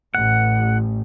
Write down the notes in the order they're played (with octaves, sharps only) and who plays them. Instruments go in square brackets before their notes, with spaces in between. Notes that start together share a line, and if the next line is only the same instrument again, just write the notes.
[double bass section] A1 [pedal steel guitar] F#5